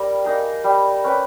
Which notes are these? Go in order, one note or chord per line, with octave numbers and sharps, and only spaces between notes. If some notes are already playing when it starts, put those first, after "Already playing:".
Already playing: G3 A#4
A#3 D#4 G#4
G3
C#4 G4 B4